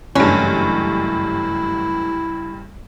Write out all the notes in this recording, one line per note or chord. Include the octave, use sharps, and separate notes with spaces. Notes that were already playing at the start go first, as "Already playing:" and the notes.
F#1 G2 E3 F#3 A3 C#4 E4